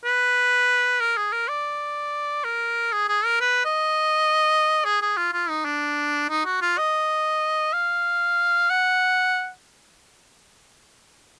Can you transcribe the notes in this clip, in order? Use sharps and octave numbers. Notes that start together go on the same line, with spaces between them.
B4
A#4
G#4
A#4
D5
A#4
G#4
G#4
A#4
B4
D#5
G#4
G#4
F4
F4
D#4
D4
D#4
F#4
F4
D#5
F5
F#5